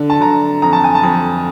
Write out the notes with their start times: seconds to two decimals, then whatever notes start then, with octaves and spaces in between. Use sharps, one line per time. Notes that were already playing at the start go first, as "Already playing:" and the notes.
Already playing: D3
0.10 A5
0.20 D3 A#5
0.62 F2 A#5
0.73 A5
0.84 G#5
0.95 A5
1.03 F2